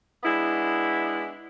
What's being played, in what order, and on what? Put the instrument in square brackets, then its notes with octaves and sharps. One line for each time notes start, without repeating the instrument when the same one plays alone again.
[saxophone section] G#3 B3 D4 E4